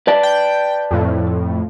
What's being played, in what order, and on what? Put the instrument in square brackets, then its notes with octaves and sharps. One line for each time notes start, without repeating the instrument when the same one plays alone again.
[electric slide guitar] B4 D5 A5
[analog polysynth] G5
F2 A2